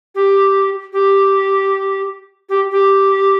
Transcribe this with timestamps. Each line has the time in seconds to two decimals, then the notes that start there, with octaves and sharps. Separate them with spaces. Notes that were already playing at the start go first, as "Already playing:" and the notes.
0.15 G4
0.93 G4
2.49 G4
2.72 G4